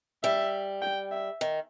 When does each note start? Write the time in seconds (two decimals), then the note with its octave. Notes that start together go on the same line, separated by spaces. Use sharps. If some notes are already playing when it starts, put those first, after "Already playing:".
0.24 G3 E5
0.82 G5
1.12 E5
1.41 D#3